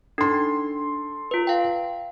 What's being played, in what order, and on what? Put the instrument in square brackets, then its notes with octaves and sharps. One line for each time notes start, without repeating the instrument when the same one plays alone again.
[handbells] D4 D#4 [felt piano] A4 C6
[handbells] F4 B4
F5 G5